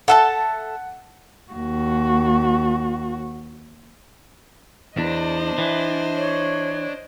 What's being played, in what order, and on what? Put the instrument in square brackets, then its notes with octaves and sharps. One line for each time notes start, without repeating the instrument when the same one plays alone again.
[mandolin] A4 E5 A5 [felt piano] F#5
[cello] D#2 F#4
[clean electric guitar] E2 [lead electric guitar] D4 [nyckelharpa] C5 D#5
[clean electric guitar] E3
[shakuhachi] C#5